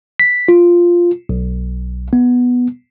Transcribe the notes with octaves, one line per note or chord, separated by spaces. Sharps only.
B6
F4
B1
B3